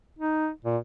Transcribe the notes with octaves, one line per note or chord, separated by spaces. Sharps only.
D#4
A#2